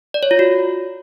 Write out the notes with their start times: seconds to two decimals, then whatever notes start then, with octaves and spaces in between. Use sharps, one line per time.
0.14 D5
0.23 C#5
0.31 F4
0.39 F#4